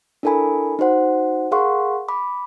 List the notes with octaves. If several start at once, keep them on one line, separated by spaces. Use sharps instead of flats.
D4 E4 A4 A#4 G#5 B5
D#4 F#4 C5 F#5
G#4 A#4 F5 F#5 C6 C#6
B5 D6